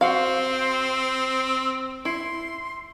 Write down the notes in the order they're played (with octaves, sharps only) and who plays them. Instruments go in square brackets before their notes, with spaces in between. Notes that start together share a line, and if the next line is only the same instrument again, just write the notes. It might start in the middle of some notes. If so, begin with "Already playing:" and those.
[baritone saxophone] C4 [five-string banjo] F#4 F5 [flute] C5
[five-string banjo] E4 [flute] C6